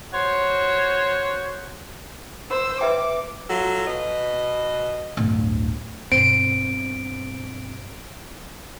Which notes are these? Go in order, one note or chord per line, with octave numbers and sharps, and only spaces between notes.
F#4 C5 C#5
C5 E6
B4 E5 G5 D6
F#3 F4 A4
B2 B4 D#5
D1 G1
G2 B2 C4 D7